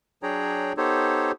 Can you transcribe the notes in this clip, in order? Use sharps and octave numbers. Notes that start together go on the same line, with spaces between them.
F#3 D4 G#4 C#5 G5 A#5
B3 D#4 G4 A4 C5 C#5